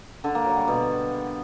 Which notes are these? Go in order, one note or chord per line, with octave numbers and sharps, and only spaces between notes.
D3
A#3
F#3
G3
B2